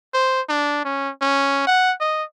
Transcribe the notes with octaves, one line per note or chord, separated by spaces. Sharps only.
C5
D4
C#4
C#4
F#5
D#5